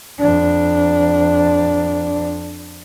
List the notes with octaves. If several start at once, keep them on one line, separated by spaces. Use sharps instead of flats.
F2 D4